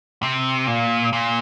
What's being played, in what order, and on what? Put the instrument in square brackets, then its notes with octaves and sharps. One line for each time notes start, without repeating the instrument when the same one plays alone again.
[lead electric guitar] C3
A#2
A#2